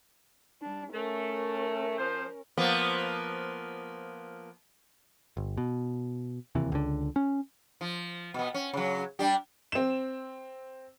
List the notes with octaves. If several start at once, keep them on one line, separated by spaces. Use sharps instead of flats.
G3 D4
A3 C#4 A#4
F3 C5
F3 A#3 B3
G1
B2
E1 D#2 C3 E3
C#2 D3
C#4
F3
B2 B3
C#4
C#3 F#3
G3 D4 G4
C4 E7